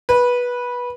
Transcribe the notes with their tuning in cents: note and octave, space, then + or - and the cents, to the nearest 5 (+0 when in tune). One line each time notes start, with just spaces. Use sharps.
B4 -15